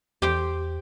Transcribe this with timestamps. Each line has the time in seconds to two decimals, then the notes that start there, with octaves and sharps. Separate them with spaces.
0.22 E2 G4 C5 G5